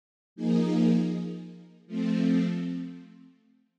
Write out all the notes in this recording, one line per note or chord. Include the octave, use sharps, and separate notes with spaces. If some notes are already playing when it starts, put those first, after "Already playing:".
F3 A#3 D#4 G#4
F3 A3 C4